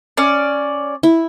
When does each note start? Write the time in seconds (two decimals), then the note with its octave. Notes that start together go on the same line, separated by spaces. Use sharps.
0.17 C#4 D5
1.03 E4